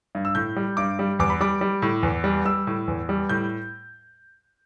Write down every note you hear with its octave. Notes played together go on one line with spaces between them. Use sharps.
G2
E6
A2 G6
G3
G2 D6
G3
E2 D6
B5
G3 D6
G3
A2
E2
G3
G3 E6
A2
E2
G3
A2 G6